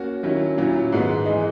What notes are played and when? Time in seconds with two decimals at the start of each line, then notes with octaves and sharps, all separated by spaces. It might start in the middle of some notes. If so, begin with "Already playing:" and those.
Already playing: A#3 C#4 F#4
0.23 D#3 F#3 C#4 E4
0.58 A#2 F#3 C#4 E4
0.92 G#2 D#3 G#3 B3
1.26 E3 G#3 D#4